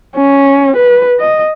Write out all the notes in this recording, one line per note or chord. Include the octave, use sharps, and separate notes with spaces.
C#4
B4
D#5